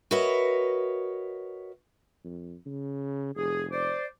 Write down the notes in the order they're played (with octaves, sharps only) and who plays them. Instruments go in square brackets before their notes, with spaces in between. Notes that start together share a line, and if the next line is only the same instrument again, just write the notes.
[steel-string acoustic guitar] F#4 A#4 B4 C#5 D#5 E5
[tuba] F2
C#3
[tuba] F1 [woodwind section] G#4
[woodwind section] C5 D5